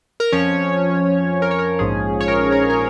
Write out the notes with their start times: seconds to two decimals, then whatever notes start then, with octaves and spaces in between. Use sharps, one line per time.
0.20 A#4
0.32 F2 F3 C#4 C#5
1.42 A#4
1.51 C#5
1.59 A#4
1.79 A#1 G#2 F3 C#4 G#4
2.20 C#5
2.28 A#4
2.52 A#4
2.70 A#4